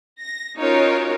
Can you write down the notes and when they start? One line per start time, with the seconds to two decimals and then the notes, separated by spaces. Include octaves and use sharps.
0.21 A#6
0.58 C#4 D#4 F4 F#4 A#4 C#5